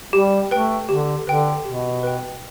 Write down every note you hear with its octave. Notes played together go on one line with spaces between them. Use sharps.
G3 G4
A3 B4 G5
D3 G4
D3 B4 G5
B2 G4
B4 G5